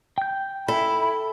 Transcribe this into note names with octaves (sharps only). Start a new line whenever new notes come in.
G5 G6
E4 A4 B5